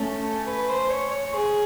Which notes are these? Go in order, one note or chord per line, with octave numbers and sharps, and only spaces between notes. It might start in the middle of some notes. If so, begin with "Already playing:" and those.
Already playing: A3 C#4 A4
B4
C5
C#5
C#5
G#4